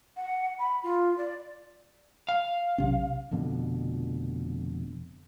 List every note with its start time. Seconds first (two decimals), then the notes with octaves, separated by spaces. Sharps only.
0.17 F#5
0.59 B5
0.83 F4
1.18 D5
2.29 F5
2.78 B1 C3 C#4
3.31 F1 F2 B2 D3